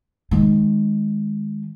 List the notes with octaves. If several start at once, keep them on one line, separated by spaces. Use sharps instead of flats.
D#3 G#3